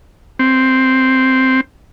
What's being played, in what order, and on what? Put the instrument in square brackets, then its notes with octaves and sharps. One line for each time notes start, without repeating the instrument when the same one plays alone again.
[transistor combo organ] C4